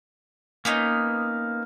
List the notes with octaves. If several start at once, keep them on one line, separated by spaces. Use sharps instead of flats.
A#3 B3 C#4 D#4